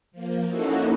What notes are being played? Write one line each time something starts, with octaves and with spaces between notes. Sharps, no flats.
F3 A#3
A#3 C#4 D#4 E4 F#4 A4